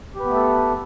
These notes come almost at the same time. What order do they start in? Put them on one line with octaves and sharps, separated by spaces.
G4 B4 B3 A3 A4